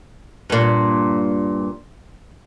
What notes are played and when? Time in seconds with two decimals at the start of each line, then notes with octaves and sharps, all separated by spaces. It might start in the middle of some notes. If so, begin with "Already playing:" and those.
0.50 G2 A#2